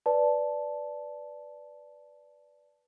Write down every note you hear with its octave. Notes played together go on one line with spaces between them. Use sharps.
B4 D5 A5